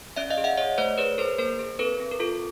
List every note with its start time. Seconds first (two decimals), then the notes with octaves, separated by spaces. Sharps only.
0.16 C#4 D5 E5
0.30 D#5 F5
0.38 G#4
0.44 E5 F#5
0.57 G#4 C#5 D#5
0.78 A3 C5 D5
0.98 G#4 B4 C#5
1.18 G#4 A#4 C5
1.38 A#3 A#4 C5
1.59 G#4
1.79 C4 A4 B4
2.00 C4
2.11 A#4
2.20 F4 A4